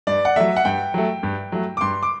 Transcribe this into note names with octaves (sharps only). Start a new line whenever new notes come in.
G2 D5
F#5
F#3 A3 E5
F#5
G2 G5
F#3 A3
G2
F#3 A3
D6
G2 C6
D6